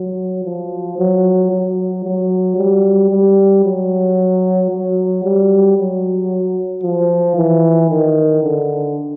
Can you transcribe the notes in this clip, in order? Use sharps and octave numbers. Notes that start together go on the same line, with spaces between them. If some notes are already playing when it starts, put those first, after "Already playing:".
Already playing: F#3
F3
F#3
F#3
F#3
G3
G3
F#3
F#3
G3
F#3
F3
E3
D#3
D3